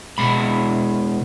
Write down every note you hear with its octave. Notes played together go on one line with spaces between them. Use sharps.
B2 G#3 B5